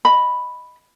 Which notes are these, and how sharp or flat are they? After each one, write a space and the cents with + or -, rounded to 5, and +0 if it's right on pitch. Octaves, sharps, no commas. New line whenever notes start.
D#5 +0 B5 +0